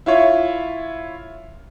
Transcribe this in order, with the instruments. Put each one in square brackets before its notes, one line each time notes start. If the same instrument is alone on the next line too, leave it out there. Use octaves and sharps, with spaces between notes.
[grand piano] E4 F4 C#5 E5